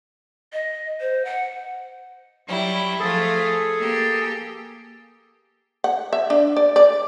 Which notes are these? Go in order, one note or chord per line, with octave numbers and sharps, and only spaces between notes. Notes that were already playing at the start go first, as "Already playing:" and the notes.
D#5
C5
F#5
F#3 G3 E4
F3 A3 F4 G#4 A4
A#3 G4
F#5
E5
D4
D5
D5